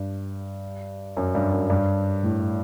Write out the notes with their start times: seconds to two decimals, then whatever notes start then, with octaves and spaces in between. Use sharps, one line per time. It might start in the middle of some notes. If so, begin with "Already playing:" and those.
Already playing: G2
1.17 F#2
1.35 G2
1.52 F#2
1.70 G2
2.23 A2